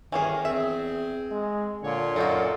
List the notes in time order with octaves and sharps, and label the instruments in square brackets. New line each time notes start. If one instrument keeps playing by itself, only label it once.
[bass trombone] G1 [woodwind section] D#3 [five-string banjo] E3 C#4 G#4
[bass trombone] E2 [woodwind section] C4 G#4 [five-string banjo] E5
[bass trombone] G#3
[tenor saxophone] A#2 [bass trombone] D3 [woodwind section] C#5
[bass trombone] F#2 [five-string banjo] A#3 D#4 F#4 [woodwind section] A4